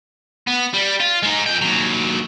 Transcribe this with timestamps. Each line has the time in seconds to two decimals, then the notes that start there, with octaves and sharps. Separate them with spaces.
0.47 B3
0.74 G3
1.00 F4
1.23 G#3 D#4
1.46 F2 G5
1.61 D#2 F#3